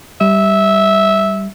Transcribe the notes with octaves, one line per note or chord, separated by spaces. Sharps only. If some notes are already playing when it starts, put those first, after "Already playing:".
G3 E5